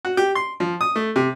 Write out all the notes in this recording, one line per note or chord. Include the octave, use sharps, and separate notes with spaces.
F#4
G4
C6
F3
D#6
A3
C3